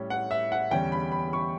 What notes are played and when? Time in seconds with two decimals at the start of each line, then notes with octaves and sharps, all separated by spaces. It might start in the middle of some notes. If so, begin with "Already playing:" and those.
Already playing: A2 G3 C#4 G4
0.10 F#5
0.31 E5
0.52 F#5
0.71 E2 D3 G3 C#4 G5
0.92 B5
1.12 B5
1.33 C#6